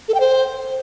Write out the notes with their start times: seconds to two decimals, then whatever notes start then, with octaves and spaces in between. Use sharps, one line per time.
0.08 A4
0.14 G5
0.20 C5